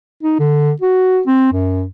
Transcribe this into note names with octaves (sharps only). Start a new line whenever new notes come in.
D#4
D3
F#4
C4
F#2